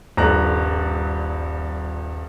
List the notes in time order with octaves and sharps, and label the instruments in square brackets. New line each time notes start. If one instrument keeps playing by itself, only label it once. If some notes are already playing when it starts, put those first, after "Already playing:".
[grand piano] D#1 A#1 G2 A#5 F#6